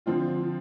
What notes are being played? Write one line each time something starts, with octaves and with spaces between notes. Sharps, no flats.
D3 F3 C4 F4